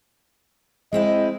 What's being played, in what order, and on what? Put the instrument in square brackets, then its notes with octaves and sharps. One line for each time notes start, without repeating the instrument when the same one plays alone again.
[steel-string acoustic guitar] G#3 C4 E4 [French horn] D#5